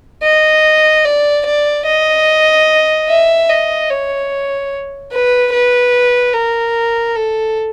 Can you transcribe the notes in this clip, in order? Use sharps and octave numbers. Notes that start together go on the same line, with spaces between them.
D#5
D5
D5
D#5
E5
D#5
C#5
B4
B4
A#4
A4